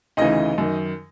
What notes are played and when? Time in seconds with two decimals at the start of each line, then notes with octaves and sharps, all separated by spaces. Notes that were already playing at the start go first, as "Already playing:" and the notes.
0.17 D2 C#3 E3 D#4 D#5
0.58 F#2 D#3